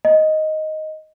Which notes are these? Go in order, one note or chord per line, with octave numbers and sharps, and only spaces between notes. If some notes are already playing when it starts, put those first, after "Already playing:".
D#5